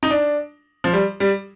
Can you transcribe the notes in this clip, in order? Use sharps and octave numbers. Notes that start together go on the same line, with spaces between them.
D#4
D4
F3
G3
G3